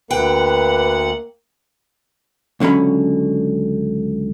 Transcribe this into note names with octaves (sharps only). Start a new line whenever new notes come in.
D2 A#3 B4 F#5 G5
C#2 D3 F#3 C#4 B5